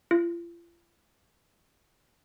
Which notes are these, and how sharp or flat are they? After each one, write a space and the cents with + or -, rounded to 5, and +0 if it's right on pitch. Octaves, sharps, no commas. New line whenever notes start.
F4 -40